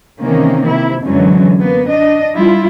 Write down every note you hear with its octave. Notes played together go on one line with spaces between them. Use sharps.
C3 D#3 E3 A#3 C#4
C3 E4
F#2 D3 E3 F#3 G#3 C#4
A#3 B3
D4 D#5
G3 E4 F4